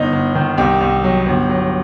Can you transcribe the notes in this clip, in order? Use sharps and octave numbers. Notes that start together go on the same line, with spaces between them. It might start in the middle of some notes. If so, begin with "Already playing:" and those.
Already playing: G1 D#4
G1
D#3
C2 D#4 G4
C2
F#3
G1
F#3